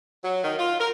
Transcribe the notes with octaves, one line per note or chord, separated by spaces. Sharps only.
F#3
D#3
F4
A#4